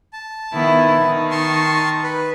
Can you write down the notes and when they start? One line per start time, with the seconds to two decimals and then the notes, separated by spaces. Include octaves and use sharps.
0.13 A5
0.53 D#3 B3 E4
1.02 D#3 D#4
1.31 A5 C6 C#6
2.03 B4